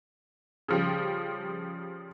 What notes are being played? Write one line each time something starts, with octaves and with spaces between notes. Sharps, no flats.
C#3 F3 G3